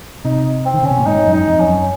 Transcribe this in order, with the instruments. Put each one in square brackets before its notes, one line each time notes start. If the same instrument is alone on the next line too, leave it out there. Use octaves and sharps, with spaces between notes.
[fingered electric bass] C3 [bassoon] D#4
[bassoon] C4
[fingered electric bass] D#3
C#3
[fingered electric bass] C3 [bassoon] C#4
[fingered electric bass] A#2
[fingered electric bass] G#2 [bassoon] D#4
[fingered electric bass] F#2
[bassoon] D#4
[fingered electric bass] F2
[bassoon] C#4
[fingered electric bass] F#2